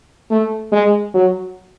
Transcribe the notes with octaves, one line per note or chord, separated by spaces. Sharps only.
A3
G#3
F#3